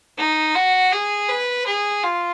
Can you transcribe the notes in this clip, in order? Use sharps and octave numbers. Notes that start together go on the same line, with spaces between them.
D#4
F#4
G#4
B4
G#4
F4